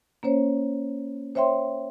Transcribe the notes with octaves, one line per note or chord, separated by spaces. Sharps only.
A#3 C#4 C5 C#5
C5 C#5 E5 G5 C6